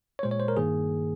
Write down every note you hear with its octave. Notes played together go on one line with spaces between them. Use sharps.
C#5
A#2 G#3 C5
C#5
C5
A#4
G2 D#3 A#3 G#4